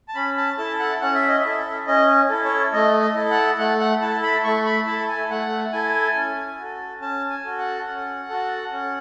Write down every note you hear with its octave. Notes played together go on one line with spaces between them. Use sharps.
A5
C#4 B5
A5
E4 A4 A5
F#5
C#4 F#5
E5
D#5
E4 A4 E5
C#4 D#5
E4 A4
C#5
A3 D#5
D#5
E4 A4
F#5
A3 F#5
F#5
E4 A4 A5
B5
A3 C#6
B5
E4 A5
A4
G#5
A3 F#5
E4 A4 G#5
C#4
F#4 A4
C#4 A5
G#5
F#4 A4
F#5
C#4
F#4 A4
C#4